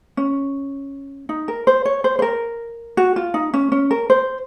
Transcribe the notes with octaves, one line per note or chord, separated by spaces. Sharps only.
C#4
D#4
A#4
C5
C#5
C5
C5
A#4
F#4
F4
D#4
C#4
C#4
A#4
C5